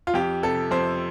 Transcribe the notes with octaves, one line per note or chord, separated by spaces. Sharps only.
F4
F2 G4
C3 A4
F2 C5